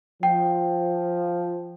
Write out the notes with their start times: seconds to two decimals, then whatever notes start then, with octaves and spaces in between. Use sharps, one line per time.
0.23 F3 G5